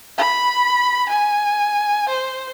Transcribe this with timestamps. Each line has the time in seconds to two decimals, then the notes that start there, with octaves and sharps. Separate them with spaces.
0.18 B5
1.09 G#5
2.09 C5